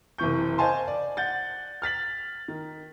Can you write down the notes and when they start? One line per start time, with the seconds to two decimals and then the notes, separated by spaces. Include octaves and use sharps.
0.18 F#1 C3 E3 C#6 G6
0.58 C5 D#5 F5 G#5 A5 C6
0.88 D5
1.17 F#5 G6 A6
1.82 F6 A6 B6 F#7
2.48 D#3